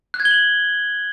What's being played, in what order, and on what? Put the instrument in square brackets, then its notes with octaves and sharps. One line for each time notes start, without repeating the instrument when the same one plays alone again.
[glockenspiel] F#6
G#6
G7
F#7